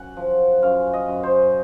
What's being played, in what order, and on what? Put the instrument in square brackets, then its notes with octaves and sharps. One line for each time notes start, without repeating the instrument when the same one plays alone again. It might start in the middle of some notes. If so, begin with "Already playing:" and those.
Already playing: [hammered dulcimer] F#2 F#5
F3
F#2 F5
D#5
F#2
C5